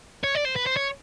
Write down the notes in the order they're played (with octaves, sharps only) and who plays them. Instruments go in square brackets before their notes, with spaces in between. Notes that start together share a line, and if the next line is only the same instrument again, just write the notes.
[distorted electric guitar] C#5
D5
C5
B4
C5
C#5